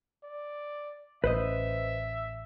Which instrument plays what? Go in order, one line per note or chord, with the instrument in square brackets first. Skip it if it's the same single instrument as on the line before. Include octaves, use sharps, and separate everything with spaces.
[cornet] D5
[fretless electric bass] A1 [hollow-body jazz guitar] B4 C5 D#5 [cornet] E5